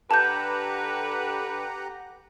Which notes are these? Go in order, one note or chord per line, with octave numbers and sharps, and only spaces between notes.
D3 G4 A4 B4 F#5 A5 A#5 G6